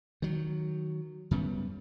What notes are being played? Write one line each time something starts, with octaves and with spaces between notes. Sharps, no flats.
D#3 F#3
F#2 C#3 G3 B3